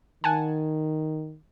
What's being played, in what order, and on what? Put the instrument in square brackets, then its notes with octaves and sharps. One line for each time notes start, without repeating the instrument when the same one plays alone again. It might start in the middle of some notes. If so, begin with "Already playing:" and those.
[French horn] D#3 [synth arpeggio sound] F#5 G#5 A5